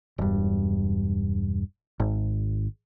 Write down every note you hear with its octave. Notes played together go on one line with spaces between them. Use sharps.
E1 G2
G#1